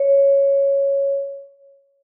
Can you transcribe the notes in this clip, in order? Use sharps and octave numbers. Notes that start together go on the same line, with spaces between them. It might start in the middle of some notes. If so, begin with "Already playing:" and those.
Already playing: C#5